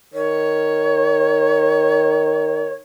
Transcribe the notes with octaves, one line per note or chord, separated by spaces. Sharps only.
D#3 C#5